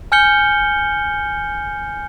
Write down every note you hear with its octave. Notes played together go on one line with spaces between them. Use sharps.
G#5 F6 G6 C#7 G7